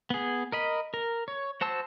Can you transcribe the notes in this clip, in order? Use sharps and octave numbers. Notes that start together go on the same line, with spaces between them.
B3 G#4
A#4 D#5 B5
A#4
C#5
F#4 C5 A5 E6